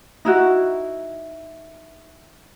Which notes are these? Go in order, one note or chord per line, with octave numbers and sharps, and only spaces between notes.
D#4 E4 F#4